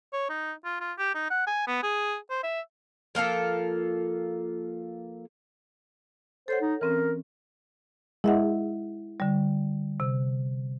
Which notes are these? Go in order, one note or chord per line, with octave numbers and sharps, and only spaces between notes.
C#5
D#4
F4
F4
G4
D#4
F#5
G#5
B3
G#4
C5
E5
F3 A#3 F4 A4
A4 C5 C#5 F#5
D#4
E3 C4 C#4 A#4
G#3 E4 E5 F#5
D3 G3
C3